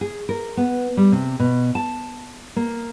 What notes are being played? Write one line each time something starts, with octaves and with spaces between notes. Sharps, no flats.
G#4
A#4
B3
G3
C3
B2
A5
A#3